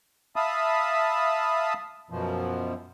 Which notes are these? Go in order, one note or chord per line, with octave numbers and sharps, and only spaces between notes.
E5 F5 A5 B5 D#6
F#2 B2 F3